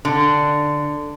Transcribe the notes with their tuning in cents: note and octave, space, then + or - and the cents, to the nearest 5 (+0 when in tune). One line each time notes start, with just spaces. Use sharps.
D3 +5